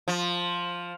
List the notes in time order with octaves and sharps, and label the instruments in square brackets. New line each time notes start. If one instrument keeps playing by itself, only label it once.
[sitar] F3